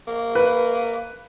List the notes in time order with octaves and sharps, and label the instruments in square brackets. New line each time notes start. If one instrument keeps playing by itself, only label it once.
[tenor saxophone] A#3
[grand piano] B4